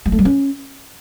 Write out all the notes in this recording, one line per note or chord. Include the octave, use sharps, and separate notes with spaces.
G3
A3
G3
C#4